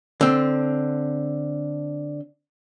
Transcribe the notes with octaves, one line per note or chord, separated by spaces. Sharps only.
D3 C4